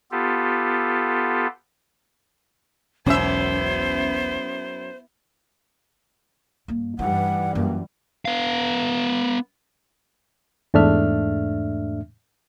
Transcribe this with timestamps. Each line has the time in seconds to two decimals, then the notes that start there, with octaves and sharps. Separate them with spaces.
0.12 B3 F4 G4 A4
3.06 E1 B1 F#2 B3 C#4 E4 C5 E5
6.68 G2 A#3
6.99 G2 E3 G3 D#4 F#5
7.55 F#2 A#3
8.25 B3 F5
10.74 E2 G#2 A3 D4 E5 F6